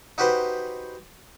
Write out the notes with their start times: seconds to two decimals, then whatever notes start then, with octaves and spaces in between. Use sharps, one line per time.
0.18 D#4 F#4 G4 B4 C5